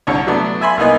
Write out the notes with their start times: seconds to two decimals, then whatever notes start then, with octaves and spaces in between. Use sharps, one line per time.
0.07 C2 D3 C#5
0.27 F#3 A3 B3 D4
0.61 E5 G#5 B5 C6
0.77 C2 A#3 B3 D#4 G#5